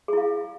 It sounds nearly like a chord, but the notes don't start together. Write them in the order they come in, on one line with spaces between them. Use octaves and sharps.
G#4 E4 F5